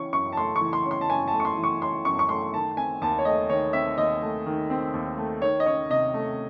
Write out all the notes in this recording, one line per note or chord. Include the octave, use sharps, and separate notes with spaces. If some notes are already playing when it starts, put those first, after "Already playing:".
Already playing: E3 C#4 C#6
F#2 C#6
A5
A3 C6
C#6
E3
C6
C#4
C6
A5
F#2 G#5
A5
A3
C#6
C6
E3
C#6
C#4 C6
F#2 C#6
C#6
A3 C6
D#3 A5
C4 G#5
D#2 A5
C#5
A3 D#5
D#3 C#5
C4 E5
D#2 D#5
A3
D#3
C4
D#2
A3
D#3 C#5
D#5
C#4 C#5
C3 D#5
A3